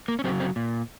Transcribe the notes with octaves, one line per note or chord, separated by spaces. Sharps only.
A#3
C#4
C#3 F#3 C4
C4
A#2